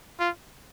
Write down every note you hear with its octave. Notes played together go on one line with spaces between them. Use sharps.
F4